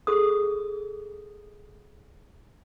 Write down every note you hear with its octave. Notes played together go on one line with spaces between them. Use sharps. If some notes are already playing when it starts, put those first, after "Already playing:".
G#4 A4 D#6